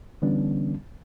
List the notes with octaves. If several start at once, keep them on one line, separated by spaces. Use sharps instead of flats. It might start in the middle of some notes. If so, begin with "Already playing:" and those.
D3 E3 G3 B3 C#4 D4